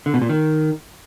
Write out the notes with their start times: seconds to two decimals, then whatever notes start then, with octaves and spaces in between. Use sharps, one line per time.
0.06 D3
0.14 B2
0.22 A#2
0.29 D#3